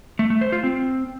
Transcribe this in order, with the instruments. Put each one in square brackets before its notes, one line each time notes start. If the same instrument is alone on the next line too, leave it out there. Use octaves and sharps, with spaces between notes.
[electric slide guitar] A3
A3
C5
F4
C4